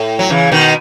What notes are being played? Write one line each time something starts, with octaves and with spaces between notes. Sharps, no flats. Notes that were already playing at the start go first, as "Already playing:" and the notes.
Already playing: A2
F#3
C#3 E3
B2 D#3